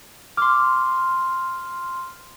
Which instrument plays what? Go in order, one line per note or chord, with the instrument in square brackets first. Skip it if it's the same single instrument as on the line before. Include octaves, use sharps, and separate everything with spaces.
[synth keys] C6 F6 [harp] D6